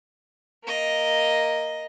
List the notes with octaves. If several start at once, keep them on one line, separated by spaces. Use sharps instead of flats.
A#3 D#5